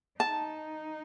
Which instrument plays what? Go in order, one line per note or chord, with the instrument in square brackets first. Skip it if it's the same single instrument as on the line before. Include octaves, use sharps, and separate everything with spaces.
[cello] D#4 [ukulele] A5